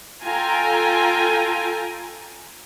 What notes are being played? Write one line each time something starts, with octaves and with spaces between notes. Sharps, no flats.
F4 A4 G5 G#5 A#5